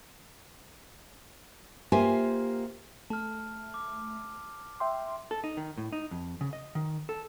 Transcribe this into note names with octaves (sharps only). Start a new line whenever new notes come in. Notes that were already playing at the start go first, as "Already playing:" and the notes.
A#3 F4 G4 C5 E5 G#5
A3 A5 F6
D6
E5 G5 C6
A4
D#4
D#3
A2
D#4
F2
C#3
D#5
D#3
A4